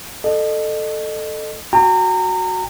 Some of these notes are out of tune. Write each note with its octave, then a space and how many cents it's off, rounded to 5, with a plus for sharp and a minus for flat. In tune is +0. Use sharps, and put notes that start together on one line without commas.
A4 +0 D#5 -30
F#4 +0 G5 +35 A#5 -30